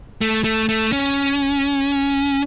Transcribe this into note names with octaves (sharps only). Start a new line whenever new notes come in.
A3
A3
A3
C#4